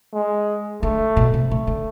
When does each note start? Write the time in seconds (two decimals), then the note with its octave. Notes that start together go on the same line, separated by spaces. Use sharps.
0.14 G#3
0.83 D3 A3
1.16 B2
1.34 C3
1.51 C#3 A3
1.67 D3